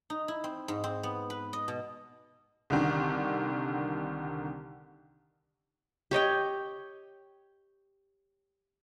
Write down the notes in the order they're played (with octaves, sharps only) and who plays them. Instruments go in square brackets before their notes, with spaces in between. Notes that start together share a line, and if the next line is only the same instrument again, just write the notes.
[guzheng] D#4
E4
C4
G#2
C4
B3
B4
D#5
B2
[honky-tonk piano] C2 D3 D#3
[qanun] G4 C#5 D#5 G5